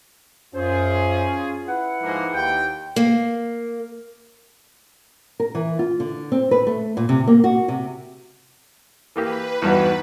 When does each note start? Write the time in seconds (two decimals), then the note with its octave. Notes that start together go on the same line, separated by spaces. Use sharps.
0.55 F#2 C#4 F4 G#4 C5
1.68 E4 B4 F#5
2.02 G#2 F3 A#3
2.33 D#2 G5
2.96 A#3
5.40 A#4
5.55 E3
5.79 F4
6.00 D3
6.32 C4
6.51 B4
6.67 A3
6.97 A#2
7.09 C3
7.28 A#3
7.44 F#4
7.68 C3
9.16 E3 A#3 G4 B4
9.62 E2 G2 B3 D#4 F#4